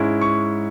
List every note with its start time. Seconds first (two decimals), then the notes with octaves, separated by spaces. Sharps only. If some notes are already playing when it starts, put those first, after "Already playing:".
Already playing: G#2 G#3 C#4 E4
0.21 C#6